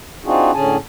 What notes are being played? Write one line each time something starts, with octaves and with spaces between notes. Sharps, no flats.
C4 D4 D#4 F4 F#4 G#4
A2 D3 C#4 G#4 G#5 A5